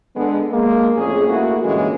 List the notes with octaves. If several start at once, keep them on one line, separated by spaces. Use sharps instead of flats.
D3 G#3 B3
G#3 A#3
F2 A2 C#4 G#4
A3 A#3 E4 F#4
G2 A#2 D3 E3 G#3 C#4